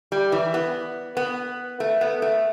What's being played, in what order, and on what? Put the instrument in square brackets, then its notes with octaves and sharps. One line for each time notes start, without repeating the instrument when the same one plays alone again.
[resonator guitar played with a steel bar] G3
E3
B3
B3
A3
B3
A3